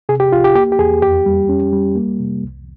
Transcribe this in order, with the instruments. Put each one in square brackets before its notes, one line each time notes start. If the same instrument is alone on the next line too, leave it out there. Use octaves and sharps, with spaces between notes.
[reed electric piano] C3 G#4
G4
C2 F4
G4
A#3 G4
G4
E2 G#4
F2 G4
G3
C#4
G3
A#3
C3
C2